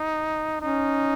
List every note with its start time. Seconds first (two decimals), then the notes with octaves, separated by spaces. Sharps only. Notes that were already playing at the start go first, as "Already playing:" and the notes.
Already playing: D#4
0.61 C#4 D#4